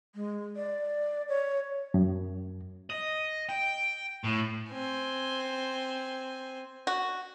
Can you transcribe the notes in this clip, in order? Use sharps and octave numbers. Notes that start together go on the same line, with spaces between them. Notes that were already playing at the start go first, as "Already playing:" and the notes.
G#3
D5
C#5
F#2
D#5
G5
A2
C4 G#5
F#4